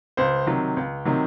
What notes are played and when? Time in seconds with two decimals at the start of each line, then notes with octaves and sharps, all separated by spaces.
0.17 C#2 C5
0.47 C3 D#3 F#3
0.77 C#2
1.05 C3 D#3 F#3